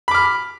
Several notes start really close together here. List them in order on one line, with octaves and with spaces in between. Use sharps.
B5 D6 F6